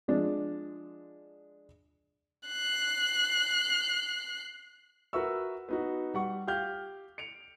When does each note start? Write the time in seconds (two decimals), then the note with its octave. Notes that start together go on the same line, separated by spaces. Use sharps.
0.08 F3 G#3 D4
2.48 F#6 C7
5.13 F#4 A#4 B4 E5 C#6 E6
5.69 B3 D#4 F#4
6.14 G3 F#5 C#6
6.47 G4 F5 F6 G6
7.18 C#7 D7 F7